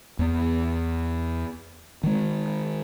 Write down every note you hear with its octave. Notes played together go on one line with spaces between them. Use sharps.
E2 B3
D#3 G#3